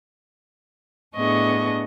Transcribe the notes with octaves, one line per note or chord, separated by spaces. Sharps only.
A2 B3 D4 G#4 D#5 C#6